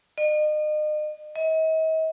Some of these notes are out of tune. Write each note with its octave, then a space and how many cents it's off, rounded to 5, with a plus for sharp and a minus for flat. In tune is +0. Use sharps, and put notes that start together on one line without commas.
D#5 -40
D#5 +40